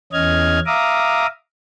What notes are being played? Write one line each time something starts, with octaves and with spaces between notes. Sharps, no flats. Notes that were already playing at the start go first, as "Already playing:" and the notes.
E2 C#4 D#5 F6 G#6
E5 F5 A#5 D6 D#6